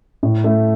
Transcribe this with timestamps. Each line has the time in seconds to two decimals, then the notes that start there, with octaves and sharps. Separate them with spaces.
0.23 A2
0.44 A3